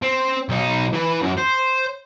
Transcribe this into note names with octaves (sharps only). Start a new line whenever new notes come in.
C4
B1 D#4
E3 B4
F#2
C5